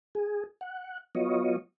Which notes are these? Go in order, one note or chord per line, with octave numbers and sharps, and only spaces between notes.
G#4
F#5
F#3 B3 F4 C#5 D#5